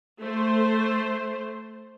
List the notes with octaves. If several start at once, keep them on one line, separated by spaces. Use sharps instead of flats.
A3 C5